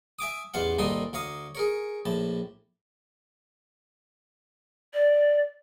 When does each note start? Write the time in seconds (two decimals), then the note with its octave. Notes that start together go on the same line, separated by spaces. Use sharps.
0.19 E5 G#5 D6 D#6
0.54 A1 E2 F4 F5 F#5
0.78 C2 A#2 D#3 A4 C6 D#6
1.13 D2 C#5 F5 A#5 D#6
1.55 G#4 A#4 C#5
2.05 A#1 A2 A5
4.94 D5